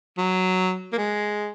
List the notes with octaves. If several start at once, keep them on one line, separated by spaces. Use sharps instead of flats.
F#3
A#3
G#3